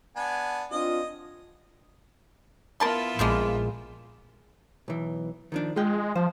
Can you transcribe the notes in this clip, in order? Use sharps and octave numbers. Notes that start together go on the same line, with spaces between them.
B3 D4 G#5
C4 D4 F4 D#5
B3 E4 F4 A#4 A5 C6
A#1 F3 G#3 A#3
B1 E3
D#3 F3 D4
G#3 F4 G5
F3 C5